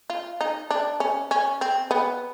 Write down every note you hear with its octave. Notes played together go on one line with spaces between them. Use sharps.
F4
D#4
D4
C#4
C#4
C4
B3